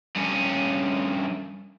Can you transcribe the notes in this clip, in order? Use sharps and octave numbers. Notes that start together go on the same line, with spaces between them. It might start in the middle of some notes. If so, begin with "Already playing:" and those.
G2 C#4